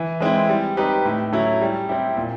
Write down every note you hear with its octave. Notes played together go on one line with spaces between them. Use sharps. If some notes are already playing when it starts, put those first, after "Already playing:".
Already playing: E3
G#3 C4 E4
G3
C4 D#4 G4 B4
A2
F#3 A3 C#4 E4
G3
C4 E4 G4
A#2